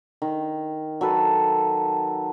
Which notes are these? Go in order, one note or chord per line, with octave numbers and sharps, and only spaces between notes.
D#3
F#3 A4 B4